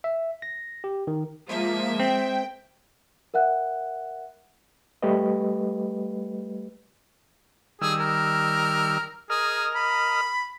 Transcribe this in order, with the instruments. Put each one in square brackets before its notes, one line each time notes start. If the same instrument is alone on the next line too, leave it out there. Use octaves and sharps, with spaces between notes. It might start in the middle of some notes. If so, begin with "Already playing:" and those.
[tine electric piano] E5
A#6
G4
D#3
[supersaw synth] F3 A#3 [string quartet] G#3 E5
[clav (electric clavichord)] C4 [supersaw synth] G5
[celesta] A#4 E5 F#5 F#6
[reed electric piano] G3 A3 G4 B4 D#5
[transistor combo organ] D#3 G3 E6 [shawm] G#4
[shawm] A#4
[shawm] G#4 [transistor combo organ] A#4 D#5 F6
[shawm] B5